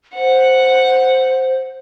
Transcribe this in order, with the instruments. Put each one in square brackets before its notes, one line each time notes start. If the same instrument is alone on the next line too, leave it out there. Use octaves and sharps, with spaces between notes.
[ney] C5 [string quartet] F#5